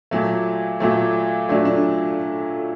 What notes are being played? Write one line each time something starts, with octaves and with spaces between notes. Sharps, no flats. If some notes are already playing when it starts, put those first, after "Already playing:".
A#2 F#3 A3
A#2 F#3 A3
A#2 F#3 A3 D4
D4